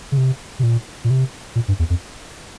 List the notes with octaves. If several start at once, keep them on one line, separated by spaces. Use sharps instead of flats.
C#3
C3
C3
A#2
A#2
C3
A#2
G2
E2
F2